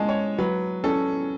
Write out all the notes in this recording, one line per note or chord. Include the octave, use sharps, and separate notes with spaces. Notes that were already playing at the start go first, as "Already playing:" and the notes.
Already playing: G#3 C#4 G#5 A5
C#5
F#3 B4
C#4 A4